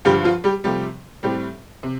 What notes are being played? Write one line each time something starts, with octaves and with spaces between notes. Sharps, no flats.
G2 D3 F3 G3 G4
F3 F4
G3 G4
C3 F3 G3 A3 G4
A2 G3 C4 G4
C3